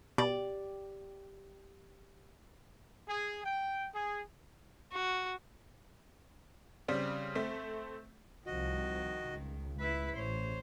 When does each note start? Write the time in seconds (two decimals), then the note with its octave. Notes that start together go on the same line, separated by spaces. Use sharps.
0.18 B2 G4 D5
3.08 G#4
3.44 G5
3.94 G#4
4.93 F#4
6.88 C#3 G3 C4
7.35 A3 C4 B6
8.46 C2 D#3 F3 F#4 D#5
9.24 C#2
9.80 E4 B4 E5
10.17 A1 C5 C#5